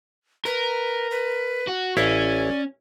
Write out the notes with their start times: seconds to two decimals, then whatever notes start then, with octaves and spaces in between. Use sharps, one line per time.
0.46 A#4 B4
1.11 B4
1.67 F#4
1.97 A1 C#4 E4 D5 F5